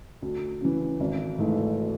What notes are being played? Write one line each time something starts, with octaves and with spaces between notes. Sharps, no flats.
D2
C#3 E3
G#1
G#2 E3 A3